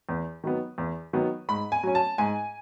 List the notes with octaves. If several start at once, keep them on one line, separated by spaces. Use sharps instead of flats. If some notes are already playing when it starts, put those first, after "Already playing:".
E2
D#3 F#3 B3
E2
D#3 F#3 B3
G#2 B5
G#5
F#3 C#4
A5
G#2 G#5